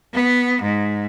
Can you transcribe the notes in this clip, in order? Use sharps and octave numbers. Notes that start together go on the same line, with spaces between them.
B3
G#2